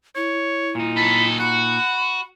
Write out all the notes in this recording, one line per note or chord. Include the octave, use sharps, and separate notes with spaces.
E4 C#5
A#2 D#4
F#3 A4 B5
F#4 F#5 B5